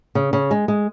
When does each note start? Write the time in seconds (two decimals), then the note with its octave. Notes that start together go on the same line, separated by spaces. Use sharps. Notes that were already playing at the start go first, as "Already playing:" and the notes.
0.15 C#3
0.33 C#3
0.51 G#3
0.68 G#3